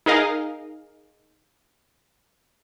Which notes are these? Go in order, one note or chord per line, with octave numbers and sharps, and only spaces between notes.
D#4 G#4 A#4 D#5 F5